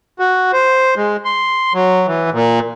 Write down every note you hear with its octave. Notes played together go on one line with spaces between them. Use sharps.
F#4
C5
G#3
C6
F#3
E3
A#2